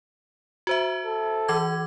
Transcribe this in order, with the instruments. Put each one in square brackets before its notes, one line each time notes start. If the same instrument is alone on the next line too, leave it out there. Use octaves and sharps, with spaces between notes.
[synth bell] F#4 C5 E5
[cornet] A4
[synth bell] E3 D6 G#6